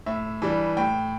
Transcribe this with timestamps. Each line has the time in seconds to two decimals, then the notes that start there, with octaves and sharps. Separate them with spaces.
0.06 A2 E5
0.42 E3 G3 D4
0.77 A2 G5